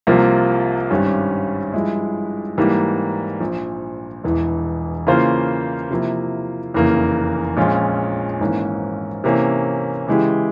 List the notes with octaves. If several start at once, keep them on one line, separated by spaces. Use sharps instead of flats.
C2 C3 F3 A#3 F4
G#1 G2 G3 C#4
G2 F3 G#3 E4
G#2 E3 G3 A#3
A#1 A#2 F3
E1 E2 E3
C#3 E3 A#3 F4 C5
C3 F3 A#3 E4
F1 E2 C#3 E3 A#3
A#1 A#2 G#3 C#4 F4
G#1 G#2 E3 A#3 C#4
C3 E3 A#3 C#4
C#3 E3 G#3 E4 G4